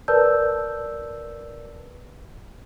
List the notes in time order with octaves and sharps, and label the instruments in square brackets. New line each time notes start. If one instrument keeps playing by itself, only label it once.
[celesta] A#4 B4 D5 A5 E6 G6